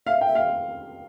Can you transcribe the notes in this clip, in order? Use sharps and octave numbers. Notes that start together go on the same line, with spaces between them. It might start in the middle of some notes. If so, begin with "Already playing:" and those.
E5 F5
G5
E5
F5